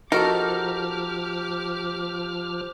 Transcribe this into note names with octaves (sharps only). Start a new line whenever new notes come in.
F3 D#4 F#4 G4 A4 A#4 D6 F6